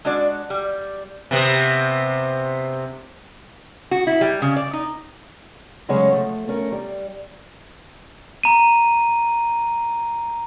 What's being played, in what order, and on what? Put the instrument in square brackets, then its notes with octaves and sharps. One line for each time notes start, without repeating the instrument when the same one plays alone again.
[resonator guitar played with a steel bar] G#3 D4 F#4 D5
G3
[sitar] C3 B3 C4
[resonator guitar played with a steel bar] F#4
E4
G3
C#3
D5
D#4
[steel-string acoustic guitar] C#3 F#3 G#3 A3 C#4 C#5
F3 A3
A3 C#4 A#4
G3
[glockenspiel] A#5 D#7